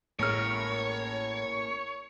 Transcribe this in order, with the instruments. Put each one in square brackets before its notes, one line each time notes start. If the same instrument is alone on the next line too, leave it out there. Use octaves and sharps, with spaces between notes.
[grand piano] A1 G#3 F6 [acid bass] A2 [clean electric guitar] A#3 C#4 A#4 [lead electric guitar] C#5